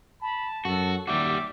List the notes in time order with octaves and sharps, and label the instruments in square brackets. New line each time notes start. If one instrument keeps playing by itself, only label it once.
[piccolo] A5 [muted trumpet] B5
[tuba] F#2 [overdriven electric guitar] F#4 [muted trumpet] A4
[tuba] D#2 [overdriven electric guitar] G3 F#4 [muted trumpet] E5 [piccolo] D6